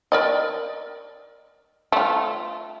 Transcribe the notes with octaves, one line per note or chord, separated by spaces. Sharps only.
A#4 D5 D#5
A3 F4